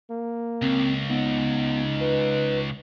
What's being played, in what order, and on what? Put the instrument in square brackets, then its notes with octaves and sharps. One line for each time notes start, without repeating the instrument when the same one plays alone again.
[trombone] A#3
[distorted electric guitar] C#2 [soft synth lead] C4
[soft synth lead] B3 [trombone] D#4
[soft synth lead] B4